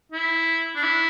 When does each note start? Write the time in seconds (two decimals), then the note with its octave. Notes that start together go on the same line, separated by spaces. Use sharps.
0.12 E4
0.75 D4
0.83 E4